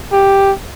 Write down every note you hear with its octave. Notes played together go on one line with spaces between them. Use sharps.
G4